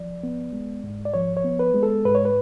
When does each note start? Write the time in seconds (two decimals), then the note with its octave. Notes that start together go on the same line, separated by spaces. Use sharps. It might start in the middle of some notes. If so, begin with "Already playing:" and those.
Already playing: F3 D5
0.23 B3
0.53 G#3
0.84 G#2
1.05 D5
1.14 F3 C#5
1.37 C#5
1.45 B3
1.59 B4
1.74 G#3
1.83 A4
2.05 G#2 B4
2.15 C#5
2.25 B4